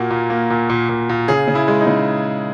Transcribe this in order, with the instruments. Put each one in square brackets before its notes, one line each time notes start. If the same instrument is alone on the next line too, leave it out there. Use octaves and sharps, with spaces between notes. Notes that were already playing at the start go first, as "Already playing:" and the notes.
Already playing: [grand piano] A#2 A#3 F#4
A#2
A#3
A#2
A#2
A#2
A#2
C#3 G#4
C#3
E4
G#3
D#4
C#3